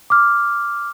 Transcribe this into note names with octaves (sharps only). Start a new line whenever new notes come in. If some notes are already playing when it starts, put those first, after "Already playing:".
D6 F6